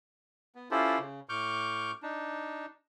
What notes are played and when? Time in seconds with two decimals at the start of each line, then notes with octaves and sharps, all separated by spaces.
0.55 B3
0.71 C#4 E4 F4 G4 A4 C5
0.99 C#3
1.29 A2 C#6 D6 F6 G6
2.03 D4 D#4